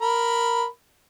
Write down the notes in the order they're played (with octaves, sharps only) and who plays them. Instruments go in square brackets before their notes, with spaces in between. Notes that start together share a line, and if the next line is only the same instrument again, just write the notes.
[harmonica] A#4 B5